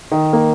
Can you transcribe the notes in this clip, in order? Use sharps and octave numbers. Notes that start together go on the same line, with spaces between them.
D#3
A#3